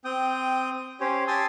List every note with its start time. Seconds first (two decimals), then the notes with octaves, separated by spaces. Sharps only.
0.05 C4 G5 D#6
1.00 C#4 G4 C5 C#5
1.28 G4 G#5 A5 C6 D#6 E6